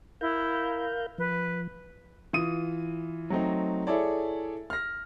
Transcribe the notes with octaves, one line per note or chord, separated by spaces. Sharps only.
E4 A#4 F5 G6
F3 B4
E3 F4 D#6 D#7
F#3 A3 C4 D#4
E4 G#4 A4 C#5 D5
F6 A#6